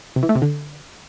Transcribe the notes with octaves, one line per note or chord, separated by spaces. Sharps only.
C3
E3
A3
C3
D3